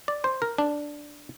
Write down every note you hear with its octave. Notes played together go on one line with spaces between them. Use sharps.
D5
C5
A#4
D4